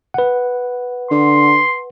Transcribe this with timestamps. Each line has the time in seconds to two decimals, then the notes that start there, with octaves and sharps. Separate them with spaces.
0.14 B4 F#5
1.11 D3 C6